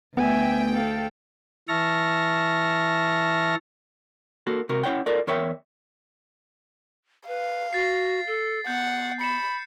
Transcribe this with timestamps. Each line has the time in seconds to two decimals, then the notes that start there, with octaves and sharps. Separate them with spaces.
0.17 D2 B3 E5 G5 G#5
0.73 A4 F5
1.69 E3 E5 A5 C#6 F6 A#6
4.47 A#3 F#4 A4
4.69 C3 F#4 A#4
4.83 C#4 E4 C#5 F#5 G5
5.06 F4 A4 A#4 D5
5.27 E2 A#4 C#5 E5 G5
7.28 B4 F5
7.73 F#4 A6 C7
8.27 A4
8.67 B3 F#5 G6
9.21 B5 C#7 E7